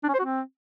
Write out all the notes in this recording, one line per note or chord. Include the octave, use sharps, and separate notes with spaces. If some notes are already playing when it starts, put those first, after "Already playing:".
D4
C#4
C5
F#4
C4